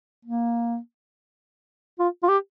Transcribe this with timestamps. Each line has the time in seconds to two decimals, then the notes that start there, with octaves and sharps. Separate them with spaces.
0.25 A#3
1.99 F4
2.23 F4
2.29 G4